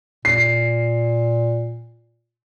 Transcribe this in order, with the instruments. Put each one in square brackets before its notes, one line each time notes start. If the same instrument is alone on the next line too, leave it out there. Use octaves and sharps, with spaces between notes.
[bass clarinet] A#2 [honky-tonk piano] C7